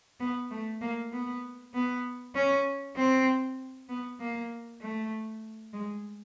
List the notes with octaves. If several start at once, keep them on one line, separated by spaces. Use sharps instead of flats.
B3
A3
A#3
B3
B3
C#4
C4
B3
A#3
A3
G#3